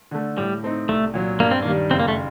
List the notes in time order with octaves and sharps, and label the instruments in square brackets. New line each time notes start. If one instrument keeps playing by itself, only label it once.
[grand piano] D3 A3
[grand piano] A2 [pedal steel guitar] G3
[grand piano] A3 C4 D#4
[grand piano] C2 [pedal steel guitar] A3
[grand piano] A#2 F#3
[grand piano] G2 [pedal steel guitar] A#3
[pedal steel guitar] C4
[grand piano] D#3 G3 [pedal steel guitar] A#3
[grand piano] F#1 [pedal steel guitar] C4
[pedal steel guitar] A#3
A3